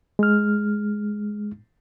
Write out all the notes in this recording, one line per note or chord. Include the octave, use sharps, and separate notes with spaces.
G#3 F6